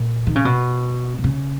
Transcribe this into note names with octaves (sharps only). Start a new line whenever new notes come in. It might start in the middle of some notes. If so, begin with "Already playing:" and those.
Already playing: A#2
D#3
C#3
B2
B2
C#3